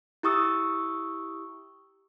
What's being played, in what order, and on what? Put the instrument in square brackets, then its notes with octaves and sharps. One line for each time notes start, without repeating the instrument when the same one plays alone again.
[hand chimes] E4 G4 C#6 D#6 E6